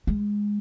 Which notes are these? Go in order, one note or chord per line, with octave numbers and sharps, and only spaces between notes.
G#3